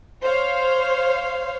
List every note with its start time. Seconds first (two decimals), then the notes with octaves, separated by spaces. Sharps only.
0.23 C5 C#5 F5